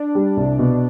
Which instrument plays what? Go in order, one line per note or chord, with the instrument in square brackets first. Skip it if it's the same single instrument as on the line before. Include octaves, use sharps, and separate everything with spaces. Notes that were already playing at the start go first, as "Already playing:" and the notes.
Already playing: [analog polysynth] D4
[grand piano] G3
C2
B2